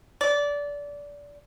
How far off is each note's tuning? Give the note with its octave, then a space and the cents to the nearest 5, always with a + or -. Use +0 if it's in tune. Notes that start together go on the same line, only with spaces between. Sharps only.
D5 -20